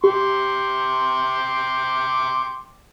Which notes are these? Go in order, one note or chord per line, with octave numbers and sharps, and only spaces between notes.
G4 G5 C6 D6